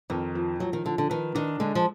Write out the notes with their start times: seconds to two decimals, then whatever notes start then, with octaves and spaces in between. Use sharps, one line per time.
0.10 F2 D#3
0.35 F3
0.60 F3 F#3
0.73 D#3
0.85 D3 F3
0.98 D3
1.10 D#3 B4
1.35 D#3 D4
1.60 D3 G#3
1.75 F3